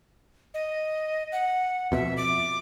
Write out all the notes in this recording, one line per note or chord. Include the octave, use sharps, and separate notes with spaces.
D#5
F#5
F2 B2 E5
D6